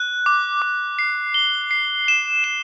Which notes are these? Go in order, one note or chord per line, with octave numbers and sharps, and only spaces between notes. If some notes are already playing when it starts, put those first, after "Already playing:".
Already playing: F#6
D6
D6
C7
G7
C7
E7
E7